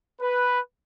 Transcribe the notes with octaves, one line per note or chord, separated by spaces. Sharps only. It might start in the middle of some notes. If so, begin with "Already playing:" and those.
B4